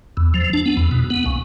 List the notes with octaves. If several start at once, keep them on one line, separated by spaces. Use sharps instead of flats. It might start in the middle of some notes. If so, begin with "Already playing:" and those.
E2
F3
D4
B3
E2
B2
B3
C#2